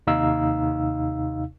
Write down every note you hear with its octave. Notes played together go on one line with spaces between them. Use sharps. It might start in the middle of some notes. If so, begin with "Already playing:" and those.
D#2 C3 D#4 F5 E6